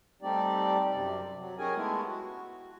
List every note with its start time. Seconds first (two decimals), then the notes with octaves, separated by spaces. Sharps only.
0.22 G3 A3 C4 D#4 G4 D5
0.92 F#2 C3 C4 D5
1.37 F#3
1.59 C#4 D#4 G4 G#4 A#4 G#5
1.75 G#3 A3 B3 E4
2.07 F#4